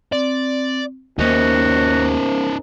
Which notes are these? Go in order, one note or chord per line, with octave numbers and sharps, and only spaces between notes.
C4 D5
D#2 A#3 C#4 D#4 F#4 A#4 C5